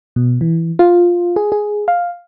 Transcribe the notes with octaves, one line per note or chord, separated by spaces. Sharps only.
B2
E3
F4
G#4
G#4
F5